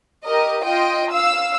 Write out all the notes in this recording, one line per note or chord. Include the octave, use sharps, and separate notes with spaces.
G4 A#4 D#5
F4 D#5 G5
F5 E6